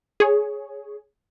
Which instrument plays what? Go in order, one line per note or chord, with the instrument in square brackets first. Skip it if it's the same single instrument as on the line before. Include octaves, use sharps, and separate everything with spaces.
[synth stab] G#4 C#5